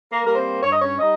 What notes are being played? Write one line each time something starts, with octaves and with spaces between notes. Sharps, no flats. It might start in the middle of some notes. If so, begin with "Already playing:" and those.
A#3 A#4
G3 A#3 A#4
C4 C5
G2 C#5
D#5
C#4 C#5
G3 D#4 D#5